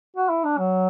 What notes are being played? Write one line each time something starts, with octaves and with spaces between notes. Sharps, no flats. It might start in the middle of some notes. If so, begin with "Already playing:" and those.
F#4
E4
D4
F#3